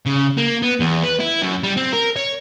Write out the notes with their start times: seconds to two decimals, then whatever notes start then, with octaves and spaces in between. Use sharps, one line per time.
0.06 C#3
0.38 A#3
0.63 B3
0.80 E2
1.03 B4
1.20 E4
1.42 F#2
1.63 G3
1.77 C4
1.93 A#4
2.16 C#5